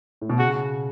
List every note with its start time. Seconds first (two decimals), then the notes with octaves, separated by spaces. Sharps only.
0.21 A2
0.30 B2
0.39 C#3 F#4